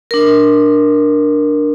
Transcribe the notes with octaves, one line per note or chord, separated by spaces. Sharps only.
D4 A#4